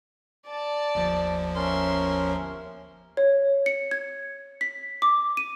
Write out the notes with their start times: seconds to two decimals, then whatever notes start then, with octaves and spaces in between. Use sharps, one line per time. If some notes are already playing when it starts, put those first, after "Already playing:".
0.47 D5 A5
0.95 G1 D#2 F3
1.56 C#4 A#4 E5 C6
3.17 C#5
3.66 C#7
3.91 G#6
4.61 B6
5.02 D6
5.37 D#7